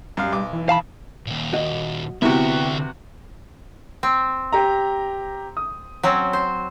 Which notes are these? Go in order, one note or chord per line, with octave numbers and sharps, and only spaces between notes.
F#2 G3 F5
B1 D6
E3
F5 A5 B5
D#2 A#2
F#4 D#5
D2 C3 E3 B3 F#4 G4 E5
C4
G4 A#5
D#6
F#3 C4 C#4
C5